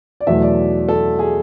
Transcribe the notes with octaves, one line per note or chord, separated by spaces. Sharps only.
D5
E2 B2 F#3 A3 E5
D5
A4
G#4